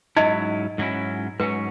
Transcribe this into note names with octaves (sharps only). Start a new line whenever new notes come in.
G#2 F#3 C#4 D#4 E4 D#5
G#2 F#3 C#4 E4
G#2 F#3 C#4 B4